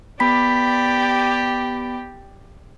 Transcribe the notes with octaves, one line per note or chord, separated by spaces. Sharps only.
B3 G4 D5 B5 B6